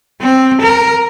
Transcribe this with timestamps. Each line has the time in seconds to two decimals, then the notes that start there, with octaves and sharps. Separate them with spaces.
0.21 C4
0.61 A#4